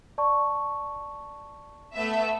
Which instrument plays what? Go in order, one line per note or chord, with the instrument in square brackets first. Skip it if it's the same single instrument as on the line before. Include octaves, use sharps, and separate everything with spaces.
[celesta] D5 A5 C#6
[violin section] A3 B3 E5